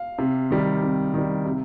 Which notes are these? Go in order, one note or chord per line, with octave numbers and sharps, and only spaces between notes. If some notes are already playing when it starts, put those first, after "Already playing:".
Already playing: F5
C3
D#3 G3
C3
D#3 G3
C3